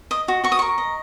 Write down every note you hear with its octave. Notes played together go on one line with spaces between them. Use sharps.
D#5 D#6
F#4
F#4 C#6
D#6
A#4 C#6
D#5